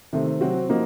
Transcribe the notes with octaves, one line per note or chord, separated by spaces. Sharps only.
C3 D#3 A3 C4
C3 F#3 C4 F#4
F3 A#3 D#4 F#4